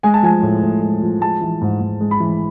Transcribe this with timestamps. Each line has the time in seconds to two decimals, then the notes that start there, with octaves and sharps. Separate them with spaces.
0.03 G#3 G#5
0.14 A5
0.23 F3 G#5
0.42 A2
0.63 A2
0.82 G#3
1.02 F3
1.21 G#3 A5
1.41 E3
1.61 G#2
1.81 G#2
2.01 G#3
2.11 B5
2.20 E3